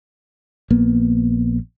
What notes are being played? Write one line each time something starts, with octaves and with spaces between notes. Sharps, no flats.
A#1 A#3 B3